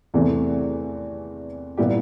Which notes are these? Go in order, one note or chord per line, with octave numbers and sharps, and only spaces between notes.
E2 C3 E3 A3 C4
A#2 G3 B3 E4 G4